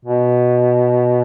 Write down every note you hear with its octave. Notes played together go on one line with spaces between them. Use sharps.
B2